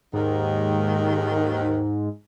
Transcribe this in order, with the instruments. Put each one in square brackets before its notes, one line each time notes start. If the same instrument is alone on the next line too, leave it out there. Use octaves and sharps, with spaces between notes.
[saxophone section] D#2 D#3 [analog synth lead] G#2